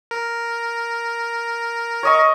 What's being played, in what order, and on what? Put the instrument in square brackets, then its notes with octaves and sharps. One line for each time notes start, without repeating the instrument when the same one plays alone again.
[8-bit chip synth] A#4
[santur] C#5 D#5 C#6